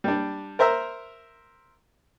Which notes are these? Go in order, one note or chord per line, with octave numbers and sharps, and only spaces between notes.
G3 D4
A#4 C5 E5 A#5